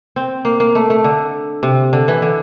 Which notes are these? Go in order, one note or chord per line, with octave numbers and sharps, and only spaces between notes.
C4
A#3
A#3
A3
A3
D3
C3
D3
E3
D3